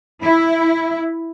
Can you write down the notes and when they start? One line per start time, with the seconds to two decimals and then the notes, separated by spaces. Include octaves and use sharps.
0.23 E4